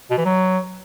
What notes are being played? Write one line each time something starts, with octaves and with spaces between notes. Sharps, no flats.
B2
E3
F#3